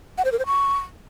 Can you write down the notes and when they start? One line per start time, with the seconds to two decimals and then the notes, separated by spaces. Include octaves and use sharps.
0.18 F#5
0.25 C5
0.32 A#4
0.39 C5
0.46 C#6